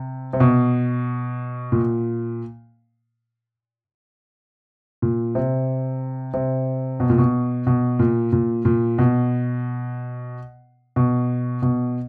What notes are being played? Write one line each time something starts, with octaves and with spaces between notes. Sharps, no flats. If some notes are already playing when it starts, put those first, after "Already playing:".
Already playing: C3
C3
B2
A#2
A#2
C3
C3
B2
A#2
B2
B2
A#2
A#2
A#2
B2
B2
B2